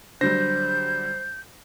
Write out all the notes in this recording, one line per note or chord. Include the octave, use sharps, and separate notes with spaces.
D3 F#3 G3 C5 G6 A#6